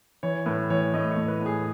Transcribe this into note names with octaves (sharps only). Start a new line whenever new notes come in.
E3 C#5
A2 B4
E3 C#5
A2 D#5
C#5
A2
B4
A2
G#4